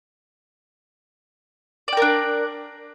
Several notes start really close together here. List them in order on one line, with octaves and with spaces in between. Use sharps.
D5 G5 A#4 D4